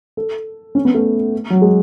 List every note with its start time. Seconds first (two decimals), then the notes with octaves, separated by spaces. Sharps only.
0.17 A4
0.75 C#4
0.85 B3
0.94 A3
1.50 F#3
1.62 G#3